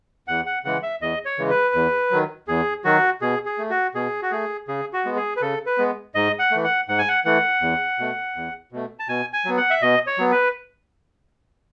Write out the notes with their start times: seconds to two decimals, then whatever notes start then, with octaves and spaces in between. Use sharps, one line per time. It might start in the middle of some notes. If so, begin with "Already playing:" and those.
0.28 E2 F#5
0.46 F#5
0.64 C#3 E3 G#3 F#5
0.83 E5
1.01 E2 D#5
1.25 C#5
1.38 C#3 E3 G#3
1.50 B4
1.74 E2
2.11 D#3 F#3
2.48 E2 G#4
2.84 D#3 F#3 F#4
3.21 B2 G#4
3.46 G#4
3.58 A3
3.70 F#4
3.95 B2 G#4
4.22 F#4
4.31 A3 G#4
4.68 C#3 G#4
4.93 F#4
5.05 G#3 B3
5.17 G#4
5.37 B4
5.41 C#3 A4
5.66 B4
5.78 G#3 B3
6.15 G#2 D#5
6.39 F#5
6.51 E3 A3
6.64 F#5
6.89 G#2 F#5
6.99 G#5
7.09 F#5
7.25 E3 A3 F#5
7.61 E2
7.99 B2 A3
8.36 E2
8.72 B2 A3
8.99 A5
9.09 B2 G#5
9.33 G#5
9.45 F#3 B3
9.57 F#5
9.70 E5
9.82 B2 D#5
10.07 C#5
10.18 F#3 B3
10.31 B4